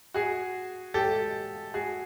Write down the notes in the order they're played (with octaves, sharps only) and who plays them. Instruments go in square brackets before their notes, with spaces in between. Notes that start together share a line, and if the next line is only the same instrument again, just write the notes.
[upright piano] F#4 G#4
G4 A4
F#4 G#4